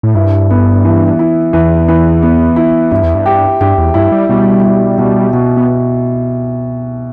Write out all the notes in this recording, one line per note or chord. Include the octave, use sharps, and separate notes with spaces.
A2
G2 E4
B3
E3
E4
E2 E3
E3
B3
E4
G2 E4
E2
G2
G4
G2 G4
E2
G2 E4
G3
B2 G3
E4
B2
B2
B3